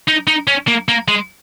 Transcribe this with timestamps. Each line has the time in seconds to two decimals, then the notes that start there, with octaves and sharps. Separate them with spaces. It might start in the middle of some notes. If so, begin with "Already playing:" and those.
0.08 D#4
0.28 D#4
0.48 C#4
0.68 A#3
0.89 A#3
1.08 G#3